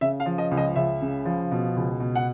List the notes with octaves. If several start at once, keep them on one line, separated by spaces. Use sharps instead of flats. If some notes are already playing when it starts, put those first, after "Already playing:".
C#3 E5
F5
F3
D#5
C#2
D#5
C#2 E5
C#3
F3
B2
C#2
B2
F#5